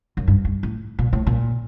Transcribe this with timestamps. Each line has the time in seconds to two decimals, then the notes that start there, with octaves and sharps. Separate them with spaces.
0.17 F#2
0.28 G2
0.45 G2
0.63 A2
0.99 A#2
1.13 A2
1.27 A#2